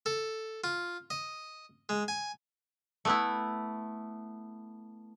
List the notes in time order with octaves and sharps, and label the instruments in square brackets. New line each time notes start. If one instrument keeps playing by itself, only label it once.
[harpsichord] A4
F4
D#5
G#3
G#5
[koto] A3 B3 E4